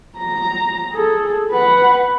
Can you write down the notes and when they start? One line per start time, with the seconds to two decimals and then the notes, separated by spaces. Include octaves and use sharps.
0.18 A#5
0.92 G#4 A4
1.52 B4 F#5